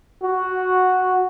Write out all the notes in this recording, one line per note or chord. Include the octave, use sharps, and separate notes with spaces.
F#4